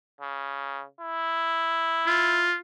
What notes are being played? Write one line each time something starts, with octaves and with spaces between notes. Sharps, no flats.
C#3
E4
F4